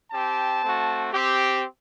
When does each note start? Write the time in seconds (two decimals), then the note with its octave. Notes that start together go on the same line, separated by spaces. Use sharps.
0.10 C4 G4 A5
0.61 A3 C4 F#4
1.12 C4 G4